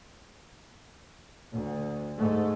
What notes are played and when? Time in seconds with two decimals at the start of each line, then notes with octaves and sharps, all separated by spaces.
1.52 D2
2.18 G#2 A3